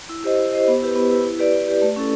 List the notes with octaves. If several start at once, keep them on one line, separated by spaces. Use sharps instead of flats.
E4
G4 C5 D#5
E4
G4 C5 D#5
B3
E4 G4 B4
B3
E4 G4 B4
E4
G4 B4 D5
E4
G4 B4 D5
A3
C#4 E4 A4